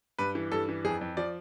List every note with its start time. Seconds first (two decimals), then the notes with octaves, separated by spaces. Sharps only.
0.19 G2 B4
0.35 E3
0.52 G2 A4
0.69 E3
0.84 F2 G#4
1.01 F2
1.17 F3 D5